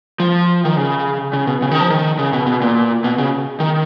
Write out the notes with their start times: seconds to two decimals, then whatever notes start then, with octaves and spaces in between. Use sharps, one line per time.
0.20 F3
0.65 D#3
0.77 C#3
1.33 C#3
1.47 B2
1.62 C#3
1.71 D#3
1.81 F3
1.90 D#3
2.19 C#3
2.33 B2
2.47 B2
2.62 A#2
3.04 B2
3.18 C#3
3.60 D#3